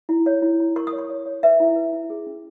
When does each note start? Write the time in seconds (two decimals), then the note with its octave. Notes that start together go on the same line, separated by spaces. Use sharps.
0.09 E4
0.26 C#5
0.42 E4
0.60 E4
0.76 A#4 C#6
0.87 D#6
0.92 C#5
0.98 C#6
1.09 C#5
1.26 C#5
1.43 B4 E5
1.60 E4
1.76 B4
1.93 E4
2.10 G#4
2.27 C#4